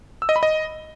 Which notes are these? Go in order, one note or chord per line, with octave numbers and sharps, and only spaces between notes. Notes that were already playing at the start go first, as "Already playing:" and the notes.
E6
D#5
B5
D#5